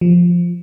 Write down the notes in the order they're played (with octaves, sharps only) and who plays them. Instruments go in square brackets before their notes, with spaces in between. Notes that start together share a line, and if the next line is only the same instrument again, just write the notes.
[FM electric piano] F3